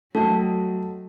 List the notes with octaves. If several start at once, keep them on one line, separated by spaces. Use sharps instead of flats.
F#3 A3 F#4 A4 D#5 G5 A5